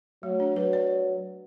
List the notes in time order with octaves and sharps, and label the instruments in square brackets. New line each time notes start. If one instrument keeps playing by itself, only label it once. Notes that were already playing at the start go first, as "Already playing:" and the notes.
[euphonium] F#3 [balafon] A3
[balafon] D4
[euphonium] F#3 [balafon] B4
[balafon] D5